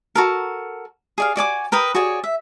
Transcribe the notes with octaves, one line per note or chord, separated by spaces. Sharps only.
F#4 A4 A#4
G#4 D5 F5
F#4 D5 G#5 D6
A#4 B4 G5 D#6
F#4 G#4 C#5 D5
E5